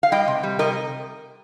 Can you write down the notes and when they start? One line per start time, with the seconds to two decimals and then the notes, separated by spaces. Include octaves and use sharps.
0.03 F5
0.12 G3 D#5 G5
0.28 C3
0.43 G3
0.59 C3 A#4 D#5